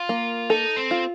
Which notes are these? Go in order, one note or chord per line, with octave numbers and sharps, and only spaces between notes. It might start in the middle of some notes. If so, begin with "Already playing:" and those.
Already playing: F4
A#3
D#4 A4
C4
F4